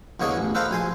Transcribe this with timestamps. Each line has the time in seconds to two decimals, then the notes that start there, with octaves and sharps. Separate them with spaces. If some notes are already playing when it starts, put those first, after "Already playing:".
0.20 E2 D3 A#3 C#5 D#5
0.37 A1
0.55 A4 B4 C5 F5 A#5
0.71 A#1 G#5 C6